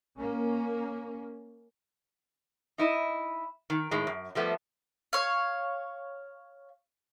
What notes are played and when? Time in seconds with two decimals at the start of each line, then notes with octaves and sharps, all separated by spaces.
0.16 A#3 C#4
2.78 D#4 E4 D#5
3.70 D#3
3.91 A2 D#3 G#3
4.07 F#2
4.35 F3 G3 A3 B3
5.13 C#5 F5